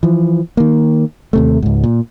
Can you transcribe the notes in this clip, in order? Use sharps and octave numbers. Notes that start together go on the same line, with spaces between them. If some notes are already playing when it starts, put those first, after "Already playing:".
E3 F3
D#3 A#3
D#2 C3 A3
C#2 G#2
A#2